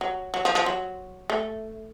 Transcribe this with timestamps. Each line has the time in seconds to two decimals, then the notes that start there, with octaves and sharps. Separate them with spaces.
0.01 F#3
0.34 F#3
0.45 F3
0.55 F3
0.66 F#3
1.30 A3